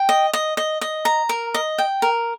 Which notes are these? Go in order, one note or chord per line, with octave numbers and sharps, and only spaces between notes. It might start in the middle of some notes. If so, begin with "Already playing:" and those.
Already playing: G5
D#5
D#5
D#5
D#5
A#5
A#4
D#5
G5
A#4